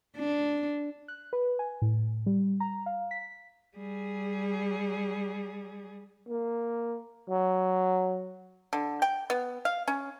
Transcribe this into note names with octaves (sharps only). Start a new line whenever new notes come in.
D4
F#6
B4
G#5
A2
G3
A#5
F5
B6
G3 G#4
A#3
F#3
D3
G5
B3
F5
C#4